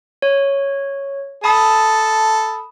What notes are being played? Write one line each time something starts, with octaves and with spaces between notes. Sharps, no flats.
C#5
A4 A5 B5 D#6